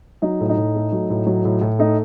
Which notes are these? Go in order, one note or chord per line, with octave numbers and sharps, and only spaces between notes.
F#3 D#4
A2
D#4
A2
A3
F#3
A2
F#3
A2
A2
A3 D#4